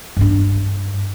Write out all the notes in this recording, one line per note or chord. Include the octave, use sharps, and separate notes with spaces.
G2 D4